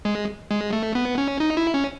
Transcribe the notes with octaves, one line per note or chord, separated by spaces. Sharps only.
G#3
G#3
A3
B3
C#4
D#4
E4
C#4